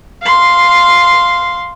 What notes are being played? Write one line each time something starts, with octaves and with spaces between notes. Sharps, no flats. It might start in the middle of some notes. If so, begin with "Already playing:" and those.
F5 C6